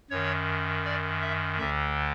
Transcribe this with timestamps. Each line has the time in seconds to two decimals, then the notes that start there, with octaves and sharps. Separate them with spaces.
0.10 F#2 D#3 C#5
0.85 D5
1.22 E5
1.59 D2 D3 E5